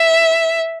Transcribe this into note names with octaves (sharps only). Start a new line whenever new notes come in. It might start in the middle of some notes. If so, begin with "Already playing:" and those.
Already playing: E5